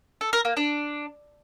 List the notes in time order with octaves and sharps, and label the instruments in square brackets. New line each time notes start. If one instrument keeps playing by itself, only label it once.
[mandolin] A4
A#4
A#3
D4